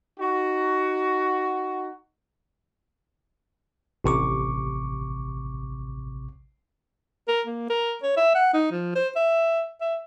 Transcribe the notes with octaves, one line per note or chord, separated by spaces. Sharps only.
D#4 F#4
A1 C3 C#6 D6
A#4
A#3
A#4
C#5
E5
F#5
D#4
F3
C5
E5
E5